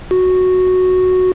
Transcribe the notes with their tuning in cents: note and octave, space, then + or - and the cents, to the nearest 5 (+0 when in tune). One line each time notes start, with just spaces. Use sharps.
F#4 -5